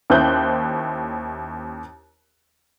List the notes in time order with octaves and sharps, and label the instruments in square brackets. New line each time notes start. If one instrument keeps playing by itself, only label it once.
[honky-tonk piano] D#2 C#4 E4 C5 F#6 G6